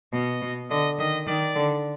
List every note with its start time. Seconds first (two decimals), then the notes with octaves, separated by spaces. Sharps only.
0.13 B2 D#5
0.42 B2
0.70 D3 D#5
0.99 D#3 D#5
1.27 D#3 D5
1.55 D3